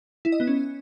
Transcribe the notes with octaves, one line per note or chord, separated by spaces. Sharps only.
E4
D#5
B3
C#4